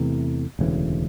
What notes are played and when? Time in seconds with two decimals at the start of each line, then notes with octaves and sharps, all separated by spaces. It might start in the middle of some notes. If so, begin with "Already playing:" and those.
Already playing: E2 C3 E3 A3
0.59 E1 D2 C#3 E3